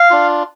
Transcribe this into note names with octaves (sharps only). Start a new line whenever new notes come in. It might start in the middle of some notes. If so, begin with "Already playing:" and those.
Already playing: F5
D4 F4